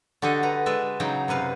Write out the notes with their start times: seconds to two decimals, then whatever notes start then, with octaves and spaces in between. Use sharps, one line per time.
0.22 D3 F#4 G4 A4 D#5
0.43 B4 A#5
0.66 G#3 B4 D5 E5
1.00 C#3 F#3 D#4 G5
1.28 F#2 C3 B4 F5